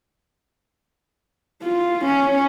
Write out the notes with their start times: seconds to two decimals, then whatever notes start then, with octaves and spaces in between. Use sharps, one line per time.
1.63 F4
2.05 C#4